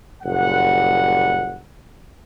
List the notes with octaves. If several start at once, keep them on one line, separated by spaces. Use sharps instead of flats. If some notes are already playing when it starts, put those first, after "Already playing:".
F#1 A#2 G3 F#5